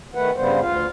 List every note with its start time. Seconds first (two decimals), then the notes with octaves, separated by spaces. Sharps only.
0.15 D#3 A3 B4 F#5
0.36 G2 C#3 G3 B3 C5
0.61 D2 F4 F5